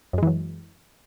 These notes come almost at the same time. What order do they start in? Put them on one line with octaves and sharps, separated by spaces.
F#2 G#3 E3 F#3